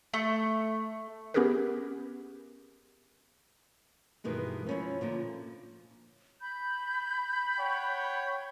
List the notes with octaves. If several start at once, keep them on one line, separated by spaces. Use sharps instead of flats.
A3
B3 C#4 G4 G#4 A#4 B4
G2 B2 D#3 E3 G#3
F3 C#4 E4
A#2 D3 F3
B5 G6
C#5 F#5 G5